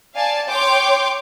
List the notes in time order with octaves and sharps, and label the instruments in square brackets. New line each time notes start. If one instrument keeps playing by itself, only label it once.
[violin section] D5 F5 G#5 A5
C#5 G5 C6 D6 G6